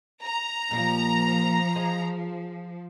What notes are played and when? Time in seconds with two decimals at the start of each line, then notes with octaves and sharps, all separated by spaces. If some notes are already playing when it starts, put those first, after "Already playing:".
0.22 A#5
0.71 A#2 F3 G3 A#3
1.76 G#4 C5 D#5